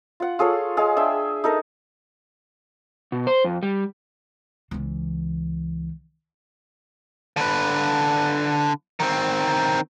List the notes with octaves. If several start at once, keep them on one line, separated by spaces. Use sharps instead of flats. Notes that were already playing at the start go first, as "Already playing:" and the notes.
F4 F#5
F4 G#4 A4 C#5
G#3 G#4 F5
D4 G#4 E5 G5
D#4 A4 A#4 D#5
B2
C5
F2
G3
C#2 E3
D3 B4
D#3 C4